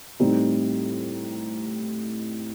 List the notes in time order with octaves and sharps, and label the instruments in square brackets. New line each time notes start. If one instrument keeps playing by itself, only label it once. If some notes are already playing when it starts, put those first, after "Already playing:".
[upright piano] A2 G3 C4 D#4